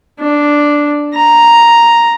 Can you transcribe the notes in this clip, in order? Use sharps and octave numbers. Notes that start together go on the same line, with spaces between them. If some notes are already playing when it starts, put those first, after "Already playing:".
D4
A#5